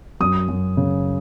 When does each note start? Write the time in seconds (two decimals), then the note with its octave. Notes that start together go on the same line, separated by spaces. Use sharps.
0.20 F#2 D#6
0.49 F#2
0.77 C#3